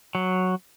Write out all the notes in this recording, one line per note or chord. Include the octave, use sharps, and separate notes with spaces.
F#3